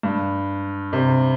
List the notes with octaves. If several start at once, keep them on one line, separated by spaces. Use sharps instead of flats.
G2
C3